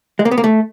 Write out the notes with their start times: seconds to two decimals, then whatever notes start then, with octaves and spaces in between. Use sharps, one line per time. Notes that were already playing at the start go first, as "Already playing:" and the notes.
0.19 G#3
0.25 A#3
0.31 B3
0.38 A#3
0.44 A3